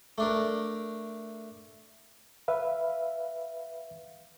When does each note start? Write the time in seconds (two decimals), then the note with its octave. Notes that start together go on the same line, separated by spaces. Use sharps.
0.18 A3 D4 A#4
2.48 B4 E5 F5